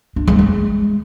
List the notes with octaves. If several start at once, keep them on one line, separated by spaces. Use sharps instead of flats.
D4
G#3
G#3